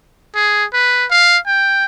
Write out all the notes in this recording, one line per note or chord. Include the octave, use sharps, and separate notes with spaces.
G#4
B4
F5
G5